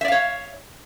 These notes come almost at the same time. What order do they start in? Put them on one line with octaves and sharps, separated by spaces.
E5 D5 F5 C#5